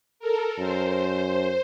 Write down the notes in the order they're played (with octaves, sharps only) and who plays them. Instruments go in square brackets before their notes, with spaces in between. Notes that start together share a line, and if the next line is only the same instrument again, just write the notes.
[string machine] A4 A#4
[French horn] F#2 [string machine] C5